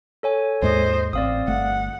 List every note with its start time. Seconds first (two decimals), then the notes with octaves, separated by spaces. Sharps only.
0.23 A4 C#5 G#5
0.62 D#2 G#2 G#3 C5 D#5
1.13 A1 C4 D5 F5 D#6
1.47 G1 A3 F#5